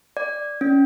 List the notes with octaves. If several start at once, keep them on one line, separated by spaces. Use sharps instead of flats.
D5
C#4